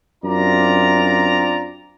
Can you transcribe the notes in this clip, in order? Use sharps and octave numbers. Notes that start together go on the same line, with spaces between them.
F#2 C4 D4 F4 D5 A#5